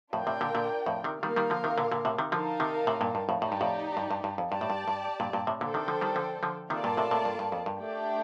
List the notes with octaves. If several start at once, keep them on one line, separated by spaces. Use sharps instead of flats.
F2 A2 D4 F4 A#4 D5 G5
A2 C3
A#2 D3
A#2 D3
F2 A2
C3 D#3
D#3 G3 A#3 F4 A#4 F5
D#3 G3
D3 F3
C3 D#3
A#2 D3
A#2 D3
A2 C3
C3 D#3
D3 F3 D#4 A#4 F5 A5
C3 D#3
A2 C3
G2 A#2
G2
F2 A2
A2 D#4 G4 D5
G2
F2 A2
G2
G2
G2
F2
G2 G4 D5 A5
A2
G2
G2
G2 A#2
G2 A#2
A2 C3
A#2 D3 D4 A4 C5 G5
C3 D#3
D3 F3
D#3 G3
D3 F3
D3 F3
C3 D#3 A#3 F4 A4 D5 A5
G2 A#2
A2 C3
A2 C3
G2
G2
F2
G2
A3 D4 G4 D5 G5